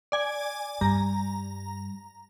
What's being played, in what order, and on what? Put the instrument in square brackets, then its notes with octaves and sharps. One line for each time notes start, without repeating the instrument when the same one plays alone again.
[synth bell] D5 G#5
[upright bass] G2 [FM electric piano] G3 [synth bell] A#5